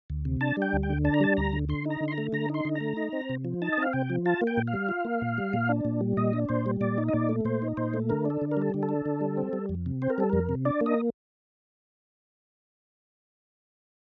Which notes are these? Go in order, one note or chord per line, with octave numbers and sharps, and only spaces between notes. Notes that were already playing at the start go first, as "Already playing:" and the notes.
D2
C3
D4 A5
G3 G5
D2
G5
D3
D4 A5
A#5
G3 A5
D2 A#5
D3
D3 C6
D#4 A#5
D3
C6
A#5
A3
D3 A#5
D#4 C6
D3
A#5
A3
D#4
C4
C3
F3
D#4 A5
D#5
C4 F5
C3 G5
F3
F4 A5
A#3
G5
A#2
F5
G3
F4
A#3
A#2
G3
A#2
D4
A#2
G3
A#2 D#5
D4
A#2 C5
G3
A#2 D5
D#4
D#5
A#2 D5
A3
A#2 C5
D#4
A#2 C5
A3
D3 A#4
D4 A4
D3
A#4
G3 A4
D3
A4
D4
D3
G3
C4
G3
F2
C3
C4 C5
A#4
G3 A4
F2 A#4
C3
D4 D5
A#3
D#5